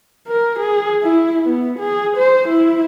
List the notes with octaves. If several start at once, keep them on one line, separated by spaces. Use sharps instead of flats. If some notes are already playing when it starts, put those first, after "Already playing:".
A#4
G#4
E4
B3
G#4
C5
E4